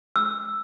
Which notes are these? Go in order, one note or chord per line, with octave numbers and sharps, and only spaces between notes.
E6